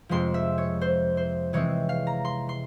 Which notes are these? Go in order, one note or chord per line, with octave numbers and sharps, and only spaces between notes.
F2 C3 F3 G#3 C6
E5
C#5
C5
C5
C3 E3 G#3 C4 C#5
F5
A#5
C6
C6